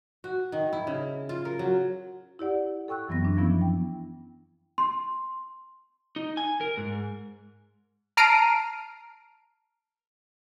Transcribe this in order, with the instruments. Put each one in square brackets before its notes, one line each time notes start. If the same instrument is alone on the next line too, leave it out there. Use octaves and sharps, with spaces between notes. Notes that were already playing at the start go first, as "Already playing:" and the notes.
[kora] F#4
D#3
E4
C#3
F4
A#4
F#3
[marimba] E4 G4 D5 F#5
A4 G5 C#6 E6 F#6
F#2 E3 F#3 B3 C4 A#6
D4
E3 F3 B3 C#4 E4
G5
[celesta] C6
[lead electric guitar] D#4
G#5
A#4
G#2
[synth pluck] A5 A#5 F6 C7 D7 D#7